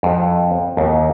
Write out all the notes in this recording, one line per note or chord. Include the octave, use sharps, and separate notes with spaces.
F2
D#2